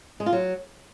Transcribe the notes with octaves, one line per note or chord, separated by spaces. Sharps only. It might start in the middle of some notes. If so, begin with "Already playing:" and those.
G#3
F4
F#3